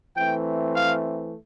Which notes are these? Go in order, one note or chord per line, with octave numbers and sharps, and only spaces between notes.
E3 A3 C4 G5
F5